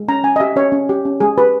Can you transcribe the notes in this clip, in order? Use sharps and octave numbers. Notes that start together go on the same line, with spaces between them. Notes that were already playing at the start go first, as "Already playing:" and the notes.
Already playing: G#3
C#4 A#5
C#4 G#5
D#5
G4 E5
C#4 C#5
C#4
G4
C#4
G#3 G#4
G4 B4